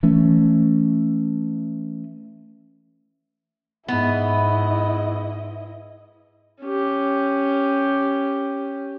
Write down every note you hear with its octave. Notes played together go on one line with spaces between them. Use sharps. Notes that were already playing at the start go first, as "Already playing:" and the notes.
E3 A3 C#4
G#2 B3 E4 D#5
C#4 G4